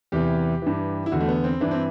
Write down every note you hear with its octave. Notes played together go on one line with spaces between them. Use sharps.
E2 C3 E3 G4
G2 E3
E4
E2 D3 F#4
A3
B3
C4
G2 E3 D4
C4